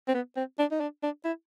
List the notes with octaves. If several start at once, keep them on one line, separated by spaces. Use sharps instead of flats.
C4
B3
C4
D4
D#4
D4
D4
E4